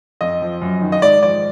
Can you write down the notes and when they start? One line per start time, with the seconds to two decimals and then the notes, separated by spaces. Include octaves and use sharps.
0.21 F2 D#5
0.42 F3
0.62 F#2
0.82 D#3
0.92 D#5
1.02 G#2 D5
1.23 F3 D5